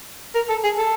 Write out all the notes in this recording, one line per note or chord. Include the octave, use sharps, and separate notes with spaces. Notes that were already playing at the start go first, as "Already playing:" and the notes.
A#4
A4
G#4
A4